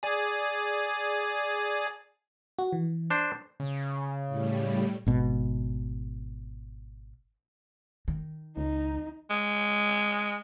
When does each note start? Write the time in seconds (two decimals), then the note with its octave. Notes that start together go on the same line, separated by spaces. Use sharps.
0.03 G#4 D5 G#5
2.59 F#4
2.72 E3
3.10 D4 C5
3.60 C#3
4.28 A2 G3
5.06 G#1 B2
8.08 D#3
8.57 C#2 D#4
9.30 G#3